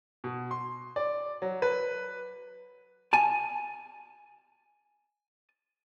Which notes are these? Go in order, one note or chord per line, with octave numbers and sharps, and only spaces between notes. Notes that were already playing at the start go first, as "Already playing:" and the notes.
B2
C6
D5
F#3
B4
G#5 A5